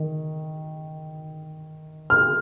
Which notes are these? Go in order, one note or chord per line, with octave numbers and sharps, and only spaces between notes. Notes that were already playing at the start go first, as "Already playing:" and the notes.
Already playing: D#3
F6